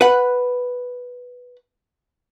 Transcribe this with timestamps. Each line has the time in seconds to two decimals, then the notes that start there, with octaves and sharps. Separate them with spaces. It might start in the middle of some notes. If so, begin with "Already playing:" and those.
0.01 B4 F#5